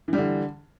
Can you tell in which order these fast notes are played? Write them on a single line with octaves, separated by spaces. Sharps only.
E3 G3 D3